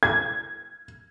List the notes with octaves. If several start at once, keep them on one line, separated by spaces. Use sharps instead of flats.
G#6